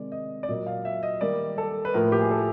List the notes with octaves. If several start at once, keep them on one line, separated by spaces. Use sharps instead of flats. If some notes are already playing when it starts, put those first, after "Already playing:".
Already playing: C3 D#3 G#3 D5
D#5
D5
A#2 F#3 A#3 D#5
F5
E5
D#5
D#3 G3 A#3 D5
A4
B4
A2 F3 A#3 A#4
G4
G#4
A4